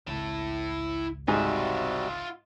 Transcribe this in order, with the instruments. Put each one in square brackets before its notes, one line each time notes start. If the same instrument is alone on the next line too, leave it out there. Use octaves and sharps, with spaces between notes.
[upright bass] G#1 C#2 [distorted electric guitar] E4 A5
[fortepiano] G#2 [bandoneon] C3 G3 F#4 [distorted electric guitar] F4 E5